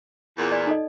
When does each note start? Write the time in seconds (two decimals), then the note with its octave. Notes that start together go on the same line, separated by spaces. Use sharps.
0.38 E2 A#2
0.52 D5
0.67 D#4 A4 D#5